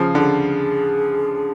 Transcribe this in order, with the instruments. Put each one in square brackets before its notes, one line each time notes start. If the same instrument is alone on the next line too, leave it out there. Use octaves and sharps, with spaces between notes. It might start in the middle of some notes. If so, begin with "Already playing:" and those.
Already playing: [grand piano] C#3 F3
[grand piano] D3 [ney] G#4